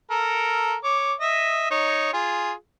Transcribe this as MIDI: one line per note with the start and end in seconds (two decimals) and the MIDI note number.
0.11 0.76 69
0.11 0.76 70
0.84 1.13 73
0.84 1.13 86
1.21 1.66 75
1.21 1.66 76
1.71 2.09 63
1.71 2.09 73
2.13 2.52 65
2.13 2.52 68